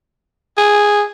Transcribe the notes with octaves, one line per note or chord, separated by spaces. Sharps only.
G#4